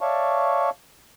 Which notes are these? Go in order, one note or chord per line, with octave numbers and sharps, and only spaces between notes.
C#5 D5 E5 F5 A5 C#6